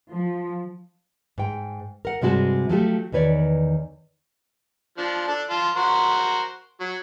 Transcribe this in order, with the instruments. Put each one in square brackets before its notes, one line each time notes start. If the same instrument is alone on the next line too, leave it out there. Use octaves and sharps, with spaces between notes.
[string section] F3
[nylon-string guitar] G#2 G5
A#4 F#5
G2 C3 G#3 F#4 A5
F3 F#3 A3 G4
E2 D#3 B4 C#5 D5
[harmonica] F3 D4
D4 A4
F4 A5
F#4 A#4 C5
F#3